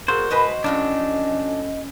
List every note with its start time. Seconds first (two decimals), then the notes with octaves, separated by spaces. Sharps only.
0.08 A#2 F#4 G#4 A#4 C5
0.30 B2 G#3 B4 D#5
0.64 F2 A2 F#3 C#4 D4